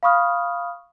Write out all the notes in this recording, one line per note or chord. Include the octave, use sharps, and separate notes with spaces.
F5 B5 C#6 D#6 F6